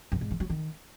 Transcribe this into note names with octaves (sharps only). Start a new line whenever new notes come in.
F#2
G#2
E3
F#3
D#3